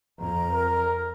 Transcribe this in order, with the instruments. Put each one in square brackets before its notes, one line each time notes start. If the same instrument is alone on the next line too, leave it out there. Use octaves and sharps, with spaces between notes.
[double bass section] F2 [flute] A#5
[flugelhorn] A#4